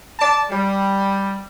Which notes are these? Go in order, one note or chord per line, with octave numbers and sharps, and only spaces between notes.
D5 A5
G3